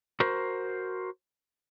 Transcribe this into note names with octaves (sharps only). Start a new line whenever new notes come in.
F#4 A#4 C5